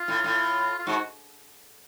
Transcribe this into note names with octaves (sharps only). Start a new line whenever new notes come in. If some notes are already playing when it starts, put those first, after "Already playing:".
Already playing: F4
A2
A2
F4
G#2 F#4